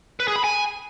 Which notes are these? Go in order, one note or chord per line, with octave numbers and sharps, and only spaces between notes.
B4
G#4
B5
G#5